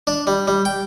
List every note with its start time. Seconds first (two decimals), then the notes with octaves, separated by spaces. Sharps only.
0.07 D4
0.27 G3
0.47 G3
0.65 G5